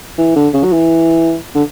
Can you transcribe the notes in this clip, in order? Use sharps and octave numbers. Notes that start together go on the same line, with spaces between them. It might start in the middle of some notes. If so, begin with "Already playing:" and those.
E3
D3
C#3
F#3
E3
D3